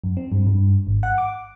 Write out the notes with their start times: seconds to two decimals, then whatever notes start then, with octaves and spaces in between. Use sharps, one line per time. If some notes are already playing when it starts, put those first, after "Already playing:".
0.04 F#2
0.17 C4
0.32 G2
0.47 G2
0.87 G#1
1.03 F#5
1.18 D6